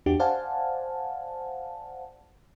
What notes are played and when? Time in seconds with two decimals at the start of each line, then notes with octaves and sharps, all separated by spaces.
0.06 E2 D4 F#4 G4
0.20 C5 D5 F5 F#5 G#5 A5